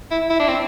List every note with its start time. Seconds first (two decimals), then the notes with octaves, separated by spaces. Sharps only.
0.11 E4
0.30 E4
0.40 D4
0.48 C4